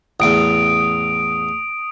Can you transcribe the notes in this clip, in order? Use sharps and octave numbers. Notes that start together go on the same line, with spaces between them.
A1 E2 D#6 D7